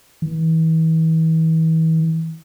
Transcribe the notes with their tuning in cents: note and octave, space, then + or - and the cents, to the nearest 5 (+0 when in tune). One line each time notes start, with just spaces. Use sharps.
E3 -40